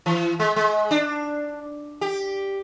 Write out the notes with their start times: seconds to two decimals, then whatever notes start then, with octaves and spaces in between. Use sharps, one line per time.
0.06 E3
0.40 G#3
0.56 G#3
0.91 D4
2.01 G4